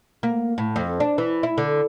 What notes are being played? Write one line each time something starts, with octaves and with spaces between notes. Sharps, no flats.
A#3
A2
F2
D4
E3
E4
D3